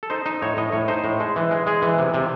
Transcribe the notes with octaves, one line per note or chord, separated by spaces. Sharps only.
A4
D#4 C5
D#4
A2 C#5
A2 D#5
A2 C#5
D#4 C5
A2
G#3
E3
G#3
G#3 G#4
E3
C3
C3